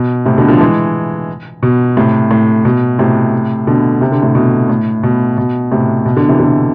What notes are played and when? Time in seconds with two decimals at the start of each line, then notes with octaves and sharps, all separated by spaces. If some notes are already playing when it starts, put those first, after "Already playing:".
Already playing: B2
0.25 A2 C3
0.38 B2 D3
0.48 D3 F3
0.61 E3 G#3
1.63 B2
1.97 A2 C3
2.31 A2
2.65 B2
2.99 A2 C3
3.67 B2 D3
4.01 C3
4.12 D3
4.22 A2 C3
4.35 B2
4.69 A2
5.03 B2
5.38 B2
5.71 A2 C3
6.05 B2
6.17 B2 D3
6.28 C3 E3
6.39 B2 D3